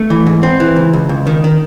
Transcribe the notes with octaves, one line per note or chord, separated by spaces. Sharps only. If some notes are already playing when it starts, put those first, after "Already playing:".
Already playing: A3
E3
G#2
C4
E3
C#2
C#2
C#2
D#3
D#3